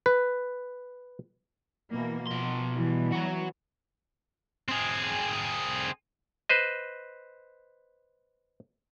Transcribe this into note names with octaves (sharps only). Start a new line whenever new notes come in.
B4
B2 E3 A#3
B2 F3 C6
E3 G3 B3
F#3 F#4
C4 G#4
B4 C5 D#5